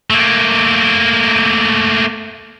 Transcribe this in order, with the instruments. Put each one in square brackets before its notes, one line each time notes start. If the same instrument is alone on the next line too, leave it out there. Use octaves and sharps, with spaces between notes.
[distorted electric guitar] A3 A#3